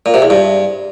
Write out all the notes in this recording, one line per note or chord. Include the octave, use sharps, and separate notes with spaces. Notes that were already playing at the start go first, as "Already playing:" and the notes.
A#2
C3
E2
G2